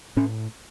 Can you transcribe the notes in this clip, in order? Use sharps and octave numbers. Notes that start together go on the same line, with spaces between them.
A2 C#4